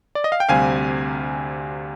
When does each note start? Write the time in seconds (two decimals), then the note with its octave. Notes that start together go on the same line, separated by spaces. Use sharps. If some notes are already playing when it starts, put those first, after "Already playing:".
0.15 D5
0.24 D#5
0.32 F5
0.40 G5
0.49 D2 C3 G3 C4 F5 G#5